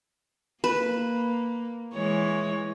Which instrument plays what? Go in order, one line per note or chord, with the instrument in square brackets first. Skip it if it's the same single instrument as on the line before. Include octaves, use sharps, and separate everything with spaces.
[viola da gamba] A#3 [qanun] B4
[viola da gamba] E3 G#3 C#5